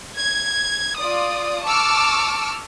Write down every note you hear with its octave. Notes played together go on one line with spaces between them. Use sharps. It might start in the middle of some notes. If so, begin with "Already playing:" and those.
G#6
F4 D5 D#6
A5 C#6 D6 E6 F6